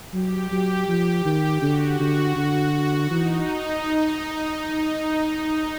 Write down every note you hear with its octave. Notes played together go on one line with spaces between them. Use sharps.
F#3 G4
F#3
F3
D#3
D3 F#4
D3
D3
E3 D#4